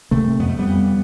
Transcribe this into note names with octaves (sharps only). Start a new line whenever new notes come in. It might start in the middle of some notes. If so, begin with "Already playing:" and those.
C3 A3 C4
F2 B3
A3
G3 B3
F2